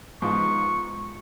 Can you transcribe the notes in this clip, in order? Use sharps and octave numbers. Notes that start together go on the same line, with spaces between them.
G#2 F3 B3 C#6